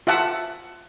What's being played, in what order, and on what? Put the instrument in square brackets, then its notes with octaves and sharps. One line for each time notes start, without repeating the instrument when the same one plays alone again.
[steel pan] F4 E5 F#5 A5